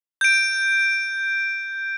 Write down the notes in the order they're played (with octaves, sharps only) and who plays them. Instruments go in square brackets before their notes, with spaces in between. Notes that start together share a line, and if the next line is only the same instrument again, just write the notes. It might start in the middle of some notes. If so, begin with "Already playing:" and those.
[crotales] G6 D7